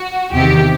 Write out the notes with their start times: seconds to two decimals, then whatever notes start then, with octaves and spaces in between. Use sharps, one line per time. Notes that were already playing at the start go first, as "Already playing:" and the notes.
Already playing: F#4
0.32 E2 C3 D#3 G4